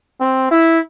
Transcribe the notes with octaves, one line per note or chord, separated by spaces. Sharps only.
C4
E4